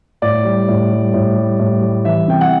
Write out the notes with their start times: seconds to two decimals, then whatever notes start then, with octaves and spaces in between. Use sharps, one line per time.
0.22 A2 D5
0.44 G3
0.68 A2
0.91 G3
1.14 A2
1.36 G3
1.59 A2
1.82 G3
2.05 E3 E5
2.28 C3 G5
2.41 F#5